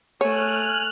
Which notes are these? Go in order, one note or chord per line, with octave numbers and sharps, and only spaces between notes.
A3 C#5 G#5 F6 F#6